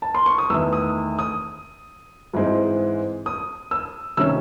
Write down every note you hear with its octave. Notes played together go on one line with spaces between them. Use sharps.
A5
C6
C#6
D#6
E2 D#3 A3 E6
D#6
D#6
G#2 E3 G#3 C4
D#6
E6
C3 D#3 A3 C#4 E6